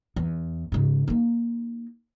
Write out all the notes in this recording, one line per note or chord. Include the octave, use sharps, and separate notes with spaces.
E2
G#2 C#3
A#3 D#4